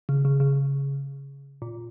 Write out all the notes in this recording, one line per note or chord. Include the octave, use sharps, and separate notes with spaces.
C#3
C#3
C#3
A#2